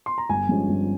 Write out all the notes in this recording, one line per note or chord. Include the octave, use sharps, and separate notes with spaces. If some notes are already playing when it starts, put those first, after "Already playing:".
C6
A#5
G1 G#5
G2 F3 G#3 C#4
G1